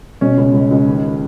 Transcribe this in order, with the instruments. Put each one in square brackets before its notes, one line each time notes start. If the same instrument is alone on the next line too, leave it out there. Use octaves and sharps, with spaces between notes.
[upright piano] B2 C#4
C#2
C#2
C#2
D#2